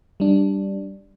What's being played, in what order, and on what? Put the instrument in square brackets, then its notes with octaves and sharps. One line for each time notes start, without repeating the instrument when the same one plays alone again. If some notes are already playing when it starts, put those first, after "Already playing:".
[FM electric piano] G3 D4